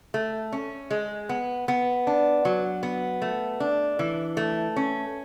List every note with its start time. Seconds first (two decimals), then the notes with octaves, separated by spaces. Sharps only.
0.14 A3
0.53 C#4
0.91 G#3
1.29 B3
1.68 B3
2.07 D4
2.45 F#3
2.83 B3
3.22 A3
3.60 D4
3.99 E3
4.37 A3
4.76 C#4